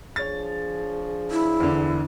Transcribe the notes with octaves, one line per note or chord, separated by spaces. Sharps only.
F3 D4 G#4 C#5 A6
E4
E2 D3